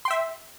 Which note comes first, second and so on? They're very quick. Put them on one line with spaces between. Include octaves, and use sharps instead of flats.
C6 G5 E5